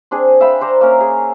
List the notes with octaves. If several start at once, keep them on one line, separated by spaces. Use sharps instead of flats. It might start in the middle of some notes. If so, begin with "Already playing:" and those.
C4 D4 G#4
E5 F5 G5 B5
C5 D5 A#5
A#3 C#4 A#4
G#4